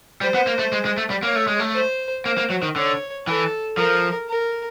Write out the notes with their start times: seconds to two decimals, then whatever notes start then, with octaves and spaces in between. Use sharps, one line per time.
0.21 G3 C5
0.34 B3
0.47 A#3
0.59 A3
0.72 G#3
0.85 G#3
0.97 A3
1.10 G3
1.23 A#3 C#5
1.36 A3
1.47 G#3
1.60 A3
1.75 C5
2.26 A#3 C5
2.38 A#3
2.50 F#3
2.63 D#3
2.76 D3 C#5
3.26 E3 A4
3.77 F3 A#4
4.29 A#4